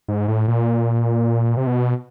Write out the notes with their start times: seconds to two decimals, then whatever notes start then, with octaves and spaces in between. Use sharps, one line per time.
0.08 G#2
0.28 A2
0.48 A#2
1.57 C3
1.67 B2